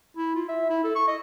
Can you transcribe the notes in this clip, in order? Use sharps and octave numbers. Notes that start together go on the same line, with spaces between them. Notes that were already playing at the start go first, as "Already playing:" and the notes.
E4
F4
E5
E4
A4
C#6
D#5